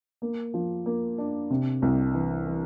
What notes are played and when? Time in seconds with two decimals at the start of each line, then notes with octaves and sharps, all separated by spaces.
0.22 A#3
0.54 F3
0.86 A#3
1.18 D4
1.50 C3
1.82 C2
2.14 E3
2.46 E3